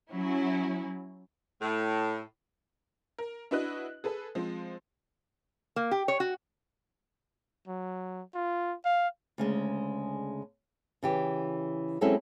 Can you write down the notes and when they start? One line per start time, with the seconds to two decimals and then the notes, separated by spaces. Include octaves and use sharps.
0.12 F#3 C#4 E4
1.62 A2
3.18 A#4
3.51 D4 E4 F#4 B4 D#5 F#6
4.04 G#4 A4 B4
4.35 F3 G#3 C4
5.76 A#3
5.91 G4
6.08 C#5
6.20 F#4
7.67 F#3
8.34 F4
8.85 F5
9.38 D2 C#3 G#3
11.03 C#3 E3 G4
12.01 F#3 G#3 C4 C#4 E4 A4